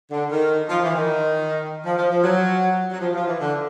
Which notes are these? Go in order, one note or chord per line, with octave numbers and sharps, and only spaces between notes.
D3
D#3
F3
E3
D#3
F3
F3
F3
F#3
F#3
F3
F3
E3
D3